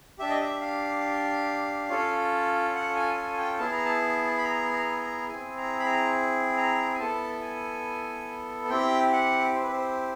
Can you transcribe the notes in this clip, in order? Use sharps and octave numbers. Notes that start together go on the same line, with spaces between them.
D4 G4 E5
D#5
E5
F5
C#4 F4 A4
F#5
G#5
G#5
G#5
G5
B3 E4 G#4 A5
A#5
A5
B5
A#5
A#5
A#5
C4 E4 G#4 G#5
A#5
B5
A#5
A#5
G#5
B3 E4 A4 A5
G#5
C4 E4 G4 G5
F#5
C5
B4
C5